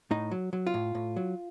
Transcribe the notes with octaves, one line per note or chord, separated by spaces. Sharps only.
A2 D#4
F#3
F#3
F4
A2
A2
F#3